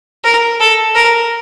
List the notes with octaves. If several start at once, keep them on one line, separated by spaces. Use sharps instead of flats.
A#4
A4
A#4